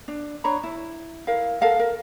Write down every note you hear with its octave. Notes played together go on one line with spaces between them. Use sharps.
D4
D4 C#5 A#5 B5
E4
E4 A#4 F5
A4 A#4 F5 F#5
A#4